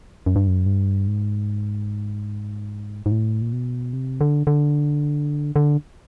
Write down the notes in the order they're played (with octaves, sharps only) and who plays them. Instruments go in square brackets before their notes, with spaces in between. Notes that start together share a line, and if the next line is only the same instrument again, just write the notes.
[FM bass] F#2
G2
F#2
G2
G#2
G#2
A2
A#2
B2
C3
D3
D3
D3